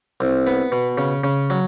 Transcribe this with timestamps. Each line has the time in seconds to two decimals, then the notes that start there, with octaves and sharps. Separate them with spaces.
0.20 C2
0.47 B3
0.72 B2
0.98 C#3
1.24 C#3
1.50 F#3